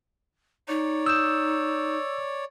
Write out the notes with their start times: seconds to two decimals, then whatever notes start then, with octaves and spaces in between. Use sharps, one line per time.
0.68 D#4 C#5 D5
1.06 D#6 E6 G6 E7